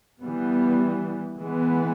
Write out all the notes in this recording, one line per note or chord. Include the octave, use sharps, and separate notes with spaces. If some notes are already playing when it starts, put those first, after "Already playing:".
E3 G3 B3
E3 G#3 B3